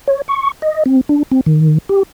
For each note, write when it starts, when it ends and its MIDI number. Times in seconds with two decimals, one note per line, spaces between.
0.08 0.22 73
0.28 0.52 85
0.62 0.83 75
0.86 1.01 60
1.09 1.23 62
1.31 1.41 60
1.46 1.78 51
1.89 2.03 67